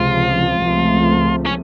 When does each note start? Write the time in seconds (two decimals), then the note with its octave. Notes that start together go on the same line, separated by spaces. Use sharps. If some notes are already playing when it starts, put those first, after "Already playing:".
Already playing: C#2 C3 F3 F4
0.62 C#2 C3 F3 A3
1.46 C#4